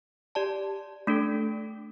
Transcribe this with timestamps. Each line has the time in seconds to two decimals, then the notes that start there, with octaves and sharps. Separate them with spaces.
0.35 G4 D5 A5
1.07 A3 D4 A4